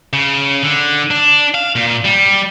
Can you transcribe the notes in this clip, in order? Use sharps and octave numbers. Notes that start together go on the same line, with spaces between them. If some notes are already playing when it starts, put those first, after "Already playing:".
C#3
D3
D4
F5
A#2
G3